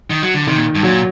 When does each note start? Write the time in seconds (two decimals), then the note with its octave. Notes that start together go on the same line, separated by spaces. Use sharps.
0.10 D#3
0.22 F#3
0.34 D3
0.47 C3 D#3
0.56 A#2
0.75 G2
0.83 A#2 F#3